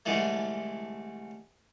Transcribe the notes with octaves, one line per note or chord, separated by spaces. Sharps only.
C2 D3 E3 G#3 A3